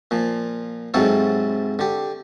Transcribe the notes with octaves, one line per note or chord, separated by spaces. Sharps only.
A#2 F3
G#2 C3 F#3 F4 A4
D3 G4